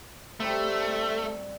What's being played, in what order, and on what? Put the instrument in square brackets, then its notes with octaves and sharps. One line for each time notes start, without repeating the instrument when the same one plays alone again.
[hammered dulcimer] G3 C4 A#5 [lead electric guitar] A3